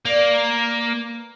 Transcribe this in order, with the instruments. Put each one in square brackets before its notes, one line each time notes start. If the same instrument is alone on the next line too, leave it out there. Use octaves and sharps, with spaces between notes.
[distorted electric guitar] A#3 [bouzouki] B4 D5